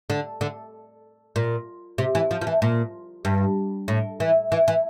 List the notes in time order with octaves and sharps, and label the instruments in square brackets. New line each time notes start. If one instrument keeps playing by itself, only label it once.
[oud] D3
D3
A#2
C3
E3
F3
F3
E3
A#2
G2
A2
E3
E3
E3